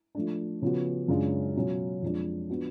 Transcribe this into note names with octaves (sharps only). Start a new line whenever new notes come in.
F3 A3 D4
C#3 F3 B3 F#4
F#2 C#3 G#3 D4 F4
B2 F#3 C#4 F4
F2 F3 G#3 D4
F3 B3 D4 F#4